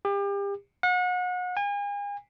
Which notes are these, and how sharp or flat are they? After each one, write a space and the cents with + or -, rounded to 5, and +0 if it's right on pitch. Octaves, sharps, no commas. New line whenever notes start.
G4 +35
F#5 -35
G#5 -40